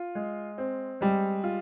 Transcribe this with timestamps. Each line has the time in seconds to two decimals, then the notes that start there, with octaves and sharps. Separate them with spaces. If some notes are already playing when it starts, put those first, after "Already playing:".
Already playing: F4
0.15 G#3
0.58 C4
1.01 G3 G#3
1.44 F4